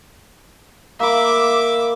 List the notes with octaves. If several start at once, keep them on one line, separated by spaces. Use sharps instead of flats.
A#3 E5 B5 D6